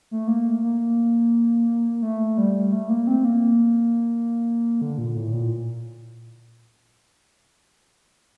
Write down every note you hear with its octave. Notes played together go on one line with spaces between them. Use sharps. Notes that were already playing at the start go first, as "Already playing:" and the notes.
A3
A#3
A#3
A3
G3
A3
A#3
C4
A#3
D3
A#2
A2
A#2